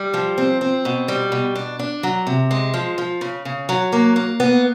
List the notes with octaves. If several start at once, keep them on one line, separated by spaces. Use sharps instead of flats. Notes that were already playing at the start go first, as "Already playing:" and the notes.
Already playing: G3
F3
C4
C4
B2
G3
B2
D4
D4
F#3
C3
G#3
F3
F3
C#3
C#3
F#3
A#3
A#3
B3